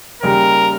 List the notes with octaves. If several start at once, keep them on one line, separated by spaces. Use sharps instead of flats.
D#2 C#3 G3 A#4